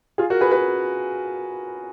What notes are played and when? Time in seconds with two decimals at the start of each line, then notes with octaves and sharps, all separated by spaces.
0.18 F4 G#4
0.30 F#4 A#4
0.41 G#4 B4
0.51 G#4 B4